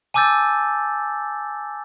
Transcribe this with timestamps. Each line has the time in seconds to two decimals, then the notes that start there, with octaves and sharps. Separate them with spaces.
0.14 G#5 A5 D6 E6 G6 A6